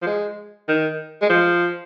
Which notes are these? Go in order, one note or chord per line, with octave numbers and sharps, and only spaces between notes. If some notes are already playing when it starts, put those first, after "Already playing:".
F3
G#3
D#3
G#3
F3